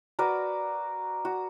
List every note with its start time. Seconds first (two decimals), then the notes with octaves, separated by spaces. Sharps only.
0.19 F#4 A#4 B4 D5
1.25 F#4